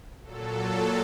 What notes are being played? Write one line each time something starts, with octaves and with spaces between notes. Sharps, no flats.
A#2 F#3 A4